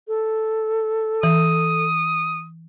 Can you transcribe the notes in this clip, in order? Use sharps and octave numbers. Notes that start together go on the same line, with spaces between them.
A4
E3 D#6